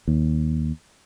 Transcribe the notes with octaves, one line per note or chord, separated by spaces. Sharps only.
D#2